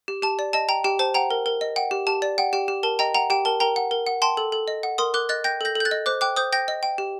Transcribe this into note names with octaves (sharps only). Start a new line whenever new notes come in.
G4
G4 A5
D5
D#5 A5
G5 A#5
G4 G5
C5 A5
F#5 G5 A#5
A#4
A#4
D#5
F#5 G5
G4
G4 A5
D5
F#5 G5
G4 G5
G4
A#4 A5
D#5 G5 A#5
F#5 G5 A#5
G4 G5
A#4 A5
A#4 G5 A#5
F#5
A#4
F#5
G5 A5 C6
A4
A4
D#5
F#5
A#4 C6 D#6
A#4 D6 F#6
D#5 F#6 A6
G5 G6 A#6
A4 G6 A#6
A4 G6
F#6 A6
D#5
C5 D6 F#6
G5 D6 F#6
C5 D#6 G6
G5 G6 A#6
D#5
G5
G4